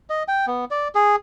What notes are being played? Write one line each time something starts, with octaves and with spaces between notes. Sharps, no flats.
D#5
G5
B3
D5
G#4